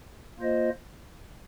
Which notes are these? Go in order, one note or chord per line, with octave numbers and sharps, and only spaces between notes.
A#3 F4 C5 D#5